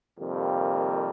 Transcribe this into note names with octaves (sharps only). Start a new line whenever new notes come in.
F2 C3 D#3 G3 A#3